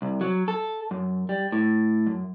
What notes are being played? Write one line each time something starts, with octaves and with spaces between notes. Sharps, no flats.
C2
F#3
A4
F#2
G3
A2
F#2